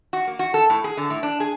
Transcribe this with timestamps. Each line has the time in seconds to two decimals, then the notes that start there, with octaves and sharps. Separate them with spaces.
0.13 F#4
0.27 A#3
0.39 F#4
0.54 A4
0.70 A2
0.84 G#4
0.97 D3
1.10 A2
1.23 D4
1.40 G#4